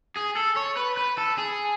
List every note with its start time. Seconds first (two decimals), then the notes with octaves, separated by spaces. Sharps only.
0.17 G#4
0.36 A4
0.57 C#5
0.77 B4
0.97 B4
1.18 A4
1.38 G#4